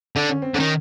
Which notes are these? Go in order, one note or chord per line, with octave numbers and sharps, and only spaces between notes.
D3 D4
C#4
C4
D3 D#3 C#4